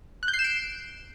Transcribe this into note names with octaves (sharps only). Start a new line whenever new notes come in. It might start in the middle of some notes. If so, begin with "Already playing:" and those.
F#6
G6
C7
E7
D7